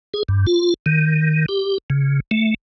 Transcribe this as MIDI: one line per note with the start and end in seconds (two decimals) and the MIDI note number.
0.14 0.23 68
0.29 0.46 43
0.47 0.74 65
0.86 1.46 51
1.49 1.78 67
1.90 2.20 49
2.31 2.54 57